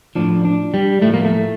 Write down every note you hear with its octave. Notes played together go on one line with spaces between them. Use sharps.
A2 F3 D4
D4
G3
A2 F3 A3
A#3
A3